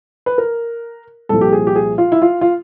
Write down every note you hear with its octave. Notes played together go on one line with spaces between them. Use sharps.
B4
A#4
C2 A#2 F3 A4
G4
G#4
G4
G#4
F4
E4
F4
F4